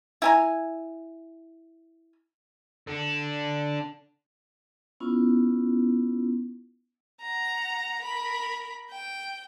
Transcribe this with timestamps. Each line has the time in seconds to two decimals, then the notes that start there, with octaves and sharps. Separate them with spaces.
0.22 E4 G#5 A#5
2.87 D3 D4
5.00 B3 C#4 E4 F4
7.21 F#5 A#5
8.02 A#4 B5
8.91 G5